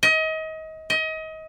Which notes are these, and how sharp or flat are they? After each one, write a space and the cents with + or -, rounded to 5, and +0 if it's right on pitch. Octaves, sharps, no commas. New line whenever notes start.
D#5 +30
D#5 +30